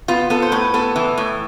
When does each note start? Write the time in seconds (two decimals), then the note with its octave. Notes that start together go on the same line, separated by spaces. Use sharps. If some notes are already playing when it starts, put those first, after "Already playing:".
0.08 B3 F4
0.30 B3 A4
0.42 C5
0.52 A2 B4
0.74 B3 A4
0.96 E3
1.17 A2